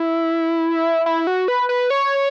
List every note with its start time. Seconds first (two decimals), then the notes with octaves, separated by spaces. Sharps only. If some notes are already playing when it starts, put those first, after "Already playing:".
Already playing: E4
1.06 E4
1.27 F#4
1.48 B4
1.69 B4
1.90 C#5